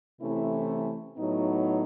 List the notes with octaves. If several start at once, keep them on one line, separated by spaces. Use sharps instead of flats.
C3 E3 A3 C#4 E4
A2 F#3 B3 D#4